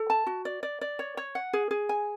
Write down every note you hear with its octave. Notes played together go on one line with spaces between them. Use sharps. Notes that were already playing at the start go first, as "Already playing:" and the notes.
Already playing: A4
A5
F#4
D5
D5
D5
C#5
C#5
F#5
G#4
G#4
G#5